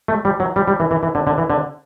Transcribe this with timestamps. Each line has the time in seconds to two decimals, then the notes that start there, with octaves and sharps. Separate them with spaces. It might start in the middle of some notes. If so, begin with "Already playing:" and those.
0.08 A3
0.25 G3
0.40 F#3
0.56 G3
0.68 G3
0.80 E3
0.91 E3
1.03 E3
1.15 D3
1.27 D3
1.38 E3
1.50 D3